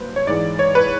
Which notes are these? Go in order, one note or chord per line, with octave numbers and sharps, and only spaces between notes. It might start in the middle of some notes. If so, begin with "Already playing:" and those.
Already playing: C2 F#3 A#3 B4 C5
C#5
G#2 E3 G#3 D5
C#5
B4